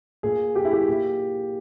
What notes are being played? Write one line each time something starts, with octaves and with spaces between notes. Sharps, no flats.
A#2 G#4
G4
E4
G4
A#2